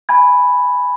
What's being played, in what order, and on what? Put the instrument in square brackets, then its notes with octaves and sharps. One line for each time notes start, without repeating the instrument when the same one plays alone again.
[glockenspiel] G#5 B5 G#6